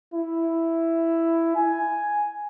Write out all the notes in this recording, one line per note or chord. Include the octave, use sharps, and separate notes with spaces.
E4
G#5